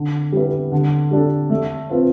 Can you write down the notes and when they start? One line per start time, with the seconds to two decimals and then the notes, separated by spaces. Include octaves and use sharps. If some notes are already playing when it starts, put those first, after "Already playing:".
Already playing: D3
0.32 G3 B3 E4 B4
0.72 D3
1.11 G3 D4 A4
1.50 A3
1.89 C4 F4 B4